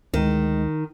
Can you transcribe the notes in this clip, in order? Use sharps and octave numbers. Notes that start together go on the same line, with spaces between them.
D2 D#3 G#3